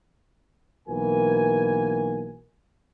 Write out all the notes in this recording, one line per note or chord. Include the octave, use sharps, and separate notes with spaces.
B1 E3 A#3 F#4 A#4 G#5